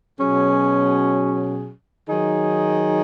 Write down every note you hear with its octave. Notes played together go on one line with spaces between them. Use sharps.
B2 F#3 C#4 G#4
D#3 F#3 D#4 G#4